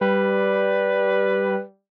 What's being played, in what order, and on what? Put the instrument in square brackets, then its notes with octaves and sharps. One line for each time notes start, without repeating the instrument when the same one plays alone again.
[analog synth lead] G3 [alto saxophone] B4